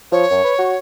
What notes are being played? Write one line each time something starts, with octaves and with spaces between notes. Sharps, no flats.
F3 C#5
F#2
B4
F#4